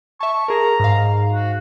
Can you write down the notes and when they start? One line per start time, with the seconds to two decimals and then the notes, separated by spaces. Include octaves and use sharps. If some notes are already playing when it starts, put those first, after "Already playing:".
0.21 E5 A5 C#6
0.48 G#4 A#4 A#5
0.80 G#2 F5
1.32 F#4